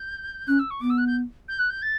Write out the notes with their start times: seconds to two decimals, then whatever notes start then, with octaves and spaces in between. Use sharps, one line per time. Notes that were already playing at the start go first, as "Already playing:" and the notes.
Already playing: G6
0.48 C#4 F#6
0.59 E6
0.70 C#6
0.81 B3 D6
0.90 E6
0.98 F#6
1.07 G6
1.48 G6
1.59 F#6
1.70 G6
1.82 A6